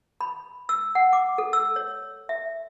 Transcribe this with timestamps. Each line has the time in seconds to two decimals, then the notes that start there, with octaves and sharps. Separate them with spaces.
0.21 B5
0.69 E6
0.95 F#5
1.13 D6
1.38 A4
1.53 E6
1.76 C#5
2.29 E5